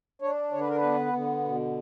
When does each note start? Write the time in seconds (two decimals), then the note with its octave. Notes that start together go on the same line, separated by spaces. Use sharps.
0.22 D4 C#5
0.52 D3 C#5
0.61 B4
0.68 A#4
0.75 B4
0.82 B3
1.13 D3
1.44 B2